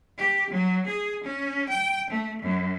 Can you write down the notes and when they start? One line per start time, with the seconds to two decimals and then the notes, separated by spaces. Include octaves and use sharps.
0.18 G4
0.50 F#3
0.86 G#4
1.24 C#4
1.69 G5
2.10 A3
2.42 F#2